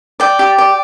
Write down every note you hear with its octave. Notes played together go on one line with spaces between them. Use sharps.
D5 G5
G4
D5